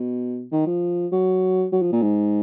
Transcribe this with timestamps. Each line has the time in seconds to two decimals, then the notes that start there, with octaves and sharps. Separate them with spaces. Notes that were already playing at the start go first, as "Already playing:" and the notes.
Already playing: B2
0.52 D#3
0.66 F3
1.12 F#3
1.72 F#3
1.82 F3
1.92 A#2
2.02 G#2